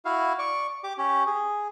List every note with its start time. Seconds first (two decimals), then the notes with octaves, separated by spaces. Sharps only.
0.05 E4 F#4 F5
0.39 D5 C#6
0.84 G4 D6
0.98 C#4 G4
1.27 G#4